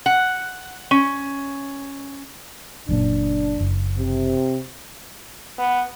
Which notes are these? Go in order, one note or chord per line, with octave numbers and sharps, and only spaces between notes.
F#5
C#4
F#1 F#2 A#2 D4
F#1
C3
B3